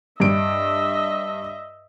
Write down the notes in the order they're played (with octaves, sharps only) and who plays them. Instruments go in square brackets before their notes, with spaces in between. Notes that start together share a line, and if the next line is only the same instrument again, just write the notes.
[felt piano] G2 D7 [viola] D#5 E5